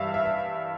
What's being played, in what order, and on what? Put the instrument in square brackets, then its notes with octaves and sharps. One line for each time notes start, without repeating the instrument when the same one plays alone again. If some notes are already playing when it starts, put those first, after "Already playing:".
Already playing: [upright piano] G2 E3 G3 E5 F5
E5
E5